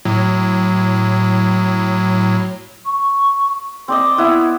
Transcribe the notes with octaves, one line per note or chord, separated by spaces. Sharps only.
A2 F#3
C#6
C4 D5 D#5 C6
B3 E4